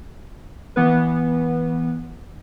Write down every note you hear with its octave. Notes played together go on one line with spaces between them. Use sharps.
E3 B3 B4